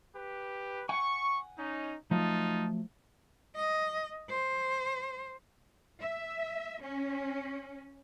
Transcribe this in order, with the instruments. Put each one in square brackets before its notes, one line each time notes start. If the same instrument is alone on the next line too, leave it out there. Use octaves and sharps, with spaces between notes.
[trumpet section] G4 B4
[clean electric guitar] F#5 G#5 [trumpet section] C#6
[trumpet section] C#4 D#4
[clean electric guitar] F3 F#3 A3 [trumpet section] D#4 F4 A5
[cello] D#5
C5
[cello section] E5
C#4